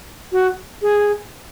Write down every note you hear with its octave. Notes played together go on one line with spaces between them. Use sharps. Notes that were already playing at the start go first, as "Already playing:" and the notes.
F#4
G#4